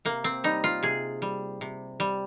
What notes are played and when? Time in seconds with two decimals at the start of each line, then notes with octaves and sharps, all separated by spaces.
0.05 C3 A#3
0.24 C4
0.44 G3 D#4
0.64 F4
0.83 C3 G#4
1.22 G3
1.61 C3
2.00 G3